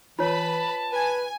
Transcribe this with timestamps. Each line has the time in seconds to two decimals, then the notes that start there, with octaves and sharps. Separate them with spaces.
0.19 E3 F4 B4 C#5 A5 B5
0.92 B4 G#5